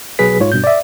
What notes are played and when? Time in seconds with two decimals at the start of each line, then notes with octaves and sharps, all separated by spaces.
0.19 B1 B2 F#3 G#4 B4 B6
0.40 G#2 F4 C#5
0.52 G2 B2 G6
0.64 D5 E5